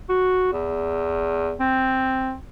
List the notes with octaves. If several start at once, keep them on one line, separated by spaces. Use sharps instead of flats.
F#4
E2
C4